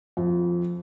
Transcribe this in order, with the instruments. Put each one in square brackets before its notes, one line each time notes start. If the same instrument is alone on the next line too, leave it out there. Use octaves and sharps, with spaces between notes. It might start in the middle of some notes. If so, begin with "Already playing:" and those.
[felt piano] F2